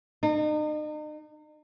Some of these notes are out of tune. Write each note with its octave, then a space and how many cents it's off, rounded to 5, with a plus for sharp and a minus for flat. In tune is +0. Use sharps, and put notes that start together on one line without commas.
D#4 -40